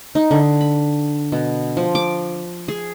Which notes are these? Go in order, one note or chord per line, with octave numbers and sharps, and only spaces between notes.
D#4
D3
B5
B2
F3
D6
G#4